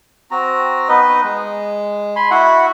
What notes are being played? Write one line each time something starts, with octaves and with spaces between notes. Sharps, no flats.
C4 F#4 A#5
B3 D#4 B4 D#5
G#3
G#5 B5 C6
E4 F#4 E5 F#5